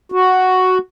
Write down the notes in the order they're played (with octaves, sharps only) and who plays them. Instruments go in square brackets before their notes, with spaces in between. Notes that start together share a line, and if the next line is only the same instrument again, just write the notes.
[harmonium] F#4